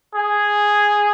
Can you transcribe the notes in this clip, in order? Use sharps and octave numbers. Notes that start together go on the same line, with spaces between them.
G#4